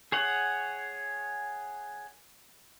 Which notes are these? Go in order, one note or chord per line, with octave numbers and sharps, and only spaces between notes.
G#4 C#5 F#5